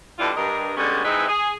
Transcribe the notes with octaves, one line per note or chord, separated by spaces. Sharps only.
B2 D3 G3 D4 E4 F4
G2 A#4 D#5
D3 G3 G#3 B3 C#4
E3 G#3 C4 D#4 B4 E5
G#4